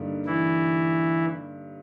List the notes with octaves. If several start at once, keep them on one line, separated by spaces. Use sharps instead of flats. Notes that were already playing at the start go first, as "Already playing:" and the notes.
Already playing: G2 D3 G3 A#3 D#4
E3 E4